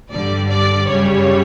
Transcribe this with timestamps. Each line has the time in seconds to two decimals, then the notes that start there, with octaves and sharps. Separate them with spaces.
0.12 G2 D3 G3 D5
0.50 D5
0.88 F#2 C#3 G3 C#5